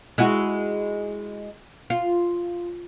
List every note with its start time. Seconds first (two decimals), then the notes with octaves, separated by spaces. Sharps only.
0.18 G#3 E4 F#4
1.90 F4